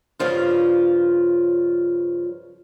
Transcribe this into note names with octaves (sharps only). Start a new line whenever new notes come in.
G2 C#3 F3 F4